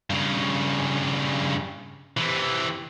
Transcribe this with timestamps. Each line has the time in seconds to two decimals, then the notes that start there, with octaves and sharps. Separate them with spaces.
0.10 G2 C#3
2.17 C3 E3